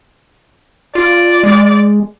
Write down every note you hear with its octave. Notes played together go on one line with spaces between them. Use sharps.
F4 D5
G#3